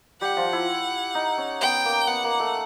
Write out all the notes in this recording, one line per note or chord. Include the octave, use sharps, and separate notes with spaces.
G3 G4 F#5
F3 F4
E4
D#4
C#4
B3 G5
A#3
B3 F#5
A#3
A3